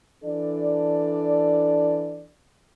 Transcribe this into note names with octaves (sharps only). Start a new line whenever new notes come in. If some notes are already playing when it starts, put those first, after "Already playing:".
E3 D4 A4 D5